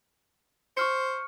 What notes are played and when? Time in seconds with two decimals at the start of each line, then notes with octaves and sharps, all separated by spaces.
0.77 C5 C#6 F6 C#7